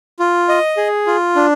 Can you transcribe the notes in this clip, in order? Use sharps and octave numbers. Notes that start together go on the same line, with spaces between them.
F4
D#5
G#4
F4
D4